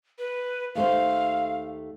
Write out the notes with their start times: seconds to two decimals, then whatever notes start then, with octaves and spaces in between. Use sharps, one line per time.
0.18 B4
0.75 D#2 A3 C5 F5